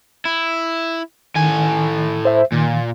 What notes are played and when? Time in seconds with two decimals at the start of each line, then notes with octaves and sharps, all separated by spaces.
0.26 E4
1.36 A2 D#3 G#5
2.25 C5 E5
2.52 A#2 D#3